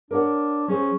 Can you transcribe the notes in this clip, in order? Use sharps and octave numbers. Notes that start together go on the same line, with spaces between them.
D4 A#4 C#5 F#5
F#3 C#4 G#4 C5